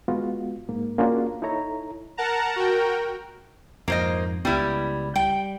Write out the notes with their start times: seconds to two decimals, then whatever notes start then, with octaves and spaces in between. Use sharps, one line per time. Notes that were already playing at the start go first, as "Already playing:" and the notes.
0.08 G#3 B3 F4 F#4
0.69 G#2 A#3
0.98 A#3 C#4 D4 F4 F#4 G#4
1.42 D#4 E4 A4 C#5 A#5
2.17 A#4 F#5 A5 A#5
2.56 F#4 A#4 G5
3.88 F2 G#2 A#3 C5 D#5
4.45 C#2 G3 B3 E4
5.16 G3 G5